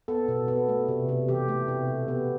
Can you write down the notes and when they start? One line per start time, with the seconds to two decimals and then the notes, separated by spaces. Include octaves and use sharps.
0.08 B3 A4
0.28 B2
0.48 B3
0.69 A3
0.88 C3
1.09 C3
1.28 E3 G4
1.48 A3
1.68 C3
1.88 B2
2.08 B3